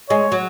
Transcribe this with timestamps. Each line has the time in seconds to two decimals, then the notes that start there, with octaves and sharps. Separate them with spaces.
0.10 G#3 C#5
0.32 F#3